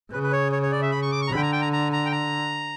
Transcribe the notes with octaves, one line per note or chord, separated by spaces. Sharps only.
C#3 B4
B4
C#5
C#5
C#5
D5
E5
B5
C#6
D6
C#6
A#5
D3 B5
G5
A#5
G5
A#5
A#5
A#5
G5
A#5